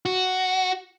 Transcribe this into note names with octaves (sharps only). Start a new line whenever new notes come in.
F#4